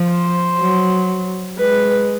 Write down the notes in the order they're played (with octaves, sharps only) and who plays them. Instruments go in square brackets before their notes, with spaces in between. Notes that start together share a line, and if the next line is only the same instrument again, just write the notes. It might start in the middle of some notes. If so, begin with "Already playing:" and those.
Already playing: [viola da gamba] F3
[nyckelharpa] C5
[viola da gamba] F#3
[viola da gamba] G#3 [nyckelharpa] B4